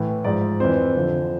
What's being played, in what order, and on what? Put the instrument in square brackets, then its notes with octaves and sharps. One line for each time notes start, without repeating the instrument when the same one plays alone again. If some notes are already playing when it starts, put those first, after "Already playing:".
Already playing: [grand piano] A2 E3
G#2 F3 D5
F2 E3 C5
F2 D3 F3